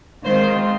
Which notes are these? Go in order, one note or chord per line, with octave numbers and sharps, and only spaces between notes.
D#3 G#3 C4 F4 C5